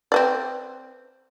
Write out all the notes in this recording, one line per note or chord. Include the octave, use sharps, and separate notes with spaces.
C4 B4 D5